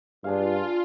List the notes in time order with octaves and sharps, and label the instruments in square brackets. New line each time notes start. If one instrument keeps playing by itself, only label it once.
[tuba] G2 [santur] D4 G#4 F5 [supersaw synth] F4